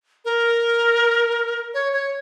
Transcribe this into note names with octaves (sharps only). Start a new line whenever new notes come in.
A#4
C#5
C#5